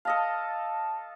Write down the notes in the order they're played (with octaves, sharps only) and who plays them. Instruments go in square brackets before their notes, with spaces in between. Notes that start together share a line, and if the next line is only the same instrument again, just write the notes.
[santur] A4 D#5 F5 [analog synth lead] A5